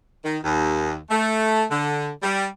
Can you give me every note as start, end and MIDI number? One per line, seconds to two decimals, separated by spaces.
0.25 0.37 51
0.43 0.96 39
1.10 1.63 57
1.71 2.10 50
2.23 2.46 55